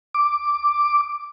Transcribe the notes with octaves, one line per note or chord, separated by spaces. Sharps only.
D6